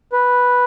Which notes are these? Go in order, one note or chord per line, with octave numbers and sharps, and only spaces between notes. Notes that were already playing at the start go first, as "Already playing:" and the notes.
B4